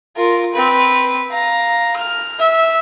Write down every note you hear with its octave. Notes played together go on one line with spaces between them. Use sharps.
F4 A#4
C4 B4
F5 A#5
F6
E5